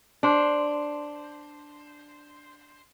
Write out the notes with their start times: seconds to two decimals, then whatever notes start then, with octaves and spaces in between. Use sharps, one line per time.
0.23 D4 C5